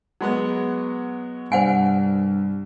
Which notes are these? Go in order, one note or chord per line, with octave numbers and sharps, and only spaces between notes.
F#3 G#3 B3
C2 G2 C5 F#5 G#5